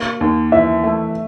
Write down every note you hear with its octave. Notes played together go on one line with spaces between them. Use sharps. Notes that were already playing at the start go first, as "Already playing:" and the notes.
Already playing: A#3
D#2
E3 E5
A3